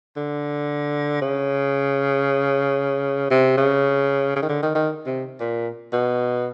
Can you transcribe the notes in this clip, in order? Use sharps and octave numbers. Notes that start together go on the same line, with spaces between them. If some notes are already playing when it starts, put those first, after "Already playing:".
D3
C#3
C3
C#3
C#3
D#3
D3
D#3
D#3
C3
A#2
B2